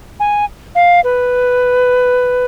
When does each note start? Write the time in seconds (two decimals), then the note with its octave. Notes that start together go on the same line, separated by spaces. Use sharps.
0.20 G#5
0.75 F5
1.04 B4